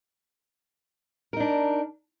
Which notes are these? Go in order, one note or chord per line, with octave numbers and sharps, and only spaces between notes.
D4 D#4 A#4